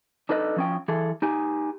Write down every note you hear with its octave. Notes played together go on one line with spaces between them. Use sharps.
D4 D#4 A4 B4 D#5
F3 C#4 G5
E3 G#4 A4
D#4 G4 G#5